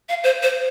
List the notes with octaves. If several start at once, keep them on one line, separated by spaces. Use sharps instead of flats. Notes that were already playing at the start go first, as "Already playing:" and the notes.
F5
C5
C5